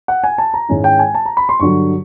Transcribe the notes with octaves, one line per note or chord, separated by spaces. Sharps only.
F#5
G#5
A5
A#5
G#2 D#3 G#3 C#4 E4
G5
G#5
A5
A#5
B5
C6
G2 D3 F#3 C#6